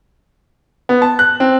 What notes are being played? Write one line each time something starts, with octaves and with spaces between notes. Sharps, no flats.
B3
A5
F#6
C4